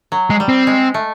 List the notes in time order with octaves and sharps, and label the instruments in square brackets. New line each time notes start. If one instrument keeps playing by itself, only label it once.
[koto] F#3
[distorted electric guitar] G#3
[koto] G3
[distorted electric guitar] C4
[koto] G#3
A3